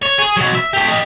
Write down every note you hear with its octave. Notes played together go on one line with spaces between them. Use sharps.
C#5
G#4
B2 F#3
E5
A3 G4
G4 D#5